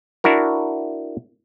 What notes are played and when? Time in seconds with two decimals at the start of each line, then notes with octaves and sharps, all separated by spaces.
0.24 D4 E4 F#4 A#4